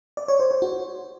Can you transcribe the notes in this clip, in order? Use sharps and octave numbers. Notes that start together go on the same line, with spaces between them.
D5
C#5
C5
C5
F#4